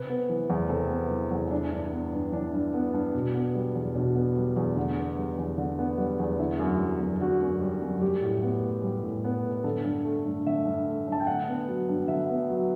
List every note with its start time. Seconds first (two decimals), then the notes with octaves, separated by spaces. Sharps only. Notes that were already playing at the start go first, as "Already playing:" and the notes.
Already playing: C3 B4
0.10 B3
0.29 E3
0.50 E2
0.69 C3 A4
0.90 B3
1.11 E3
1.31 E2
1.51 E3 D4
1.71 G2
1.92 B3
2.13 G2
2.32 E3 D4
2.53 G2
2.74 B3
2.94 G2
3.15 B2
3.34 B3
3.55 G3
3.75 E2
3.95 B2 D4
4.16 B3
4.37 G3
4.56 E2
4.77 D3
4.97 B3
5.18 G3
5.38 E2
5.58 D3
5.79 B3
5.98 G3
6.20 E2
6.39 D3 E4
6.59 F#2
6.80 G3
7.00 F#2
7.21 D3 F#4
7.41 F#2
7.61 G3
7.82 F#2
8.02 G3 G4
8.22 A2
8.42 B3
8.63 A2
8.83 G3
9.03 A2
9.24 B3
9.44 A2
9.64 D3 A4
9.84 G2
10.05 A3
10.26 G2
10.47 D3 E5
10.66 G2
10.87 A3
11.08 G2 A5
11.20 G5
11.27 D3 F#5
11.48 B3
11.68 F#3
11.89 G2
12.08 D3 E5
12.30 B3
12.50 F#3